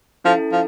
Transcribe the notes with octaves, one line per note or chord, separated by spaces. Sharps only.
F3 C#4 E4 A4
F3